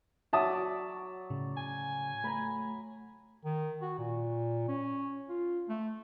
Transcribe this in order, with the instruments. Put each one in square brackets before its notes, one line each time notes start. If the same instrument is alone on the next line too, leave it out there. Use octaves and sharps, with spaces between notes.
[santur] F#3 D5 [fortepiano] E5 A5 D#6
[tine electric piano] A2 C#3
[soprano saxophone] G#5
[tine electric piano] A3 [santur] A#5 B5
[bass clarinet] D#3
F#4
A#2
C#4
F4
A3